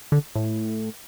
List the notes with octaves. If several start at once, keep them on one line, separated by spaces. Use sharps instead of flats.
D3
A2